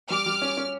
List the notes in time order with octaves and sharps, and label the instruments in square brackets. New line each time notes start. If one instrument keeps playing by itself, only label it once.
[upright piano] G3 [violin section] D6 F6
[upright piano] G3
C#4
C#4